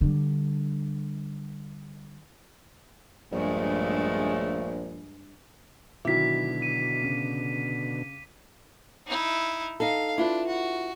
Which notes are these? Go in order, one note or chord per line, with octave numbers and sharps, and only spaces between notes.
D3 G3
A#1 G2 C#3 G#3 A3
B2 D3 D#3 F#3 E4 D6 B6
D#7
C#3
D#4 E4
D#4 A4 F5
D4 E4 F4 B4
F#4